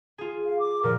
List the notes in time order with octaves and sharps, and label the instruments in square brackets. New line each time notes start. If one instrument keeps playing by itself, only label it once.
[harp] F4 G#4
[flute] F5
D6
[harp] A#2 F3 G3 [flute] A#4